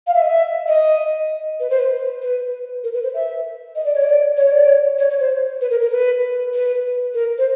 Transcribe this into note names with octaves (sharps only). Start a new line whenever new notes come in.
F5
E5
D#5
E5
D#5
B4
C5
B4
B4
A#4
B4
C5
E5
D#5
D5
C#5
D5
C#5
D5
C#5
C#5
C#5
C5
B4
A#4
A#4
B4
B4
A#4
C5